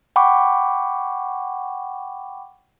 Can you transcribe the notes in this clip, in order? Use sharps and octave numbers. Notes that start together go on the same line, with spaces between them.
F#5 G5 B5 C#6 D6